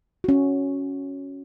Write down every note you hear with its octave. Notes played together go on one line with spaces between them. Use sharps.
C#4 F#4